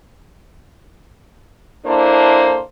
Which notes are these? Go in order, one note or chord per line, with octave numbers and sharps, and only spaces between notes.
A#3 D4 E4 A4 C5